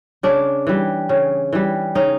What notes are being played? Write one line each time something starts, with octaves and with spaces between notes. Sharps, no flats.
C#3 D4
E3 G3
C#3
E3 G3
C#3 D#4